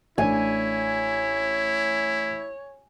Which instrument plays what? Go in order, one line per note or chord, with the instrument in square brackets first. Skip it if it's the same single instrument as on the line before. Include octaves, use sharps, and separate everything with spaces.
[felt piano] A1 D4 [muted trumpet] E4 [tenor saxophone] C#5 [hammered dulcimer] G#5